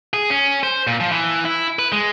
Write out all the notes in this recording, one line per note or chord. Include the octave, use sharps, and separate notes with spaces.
G#4
C#4
C5
A#2
F3
E3
E4
B4
G#3